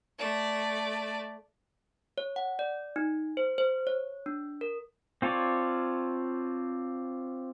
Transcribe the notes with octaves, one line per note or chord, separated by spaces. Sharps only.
A3 D5
C#5
F#5
D5
D#4
C5
C5
C#5
D4
A#4
C4 F4 A4 C#5 D5